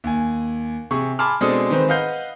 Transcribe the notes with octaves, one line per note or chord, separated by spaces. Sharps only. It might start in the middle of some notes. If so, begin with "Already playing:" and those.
D#2 G#5
C3 G#4 C#6
G#5 A5 B5 C6 D6 F6
B2 G#3 C4 D4 A4 D#6
D#3 G#3 C4 B4 C5
B4 D#5 F5 F#5 G6